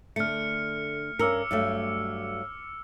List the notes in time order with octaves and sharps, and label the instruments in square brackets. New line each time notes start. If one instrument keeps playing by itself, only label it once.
[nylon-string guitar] D3 A3 [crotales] F6 C#7
[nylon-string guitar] G2 C#4 A#4 [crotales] D6 E6 C#7
[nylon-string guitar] G2 F#3 A3